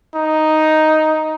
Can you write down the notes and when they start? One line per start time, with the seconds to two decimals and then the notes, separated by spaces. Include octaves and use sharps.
0.15 D#4